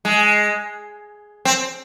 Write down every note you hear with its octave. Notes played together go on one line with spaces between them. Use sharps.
G#3
C4